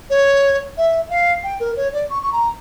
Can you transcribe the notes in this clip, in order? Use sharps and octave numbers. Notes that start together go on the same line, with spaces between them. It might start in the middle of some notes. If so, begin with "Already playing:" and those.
C#5
E5
F5
G5
A#4
C#5
D5
C#6
C#6
A#5